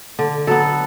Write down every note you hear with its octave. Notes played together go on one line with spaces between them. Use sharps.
D3
F#3 B3 A4